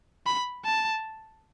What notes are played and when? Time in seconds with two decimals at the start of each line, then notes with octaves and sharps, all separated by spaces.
0.26 B5
0.65 A5